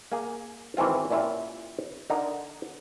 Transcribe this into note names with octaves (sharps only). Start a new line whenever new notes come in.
A#3 G#4
G#1 E3 A3 C4 F4
A#2 C#4 E4 F4 G4
D3 D#4 A#4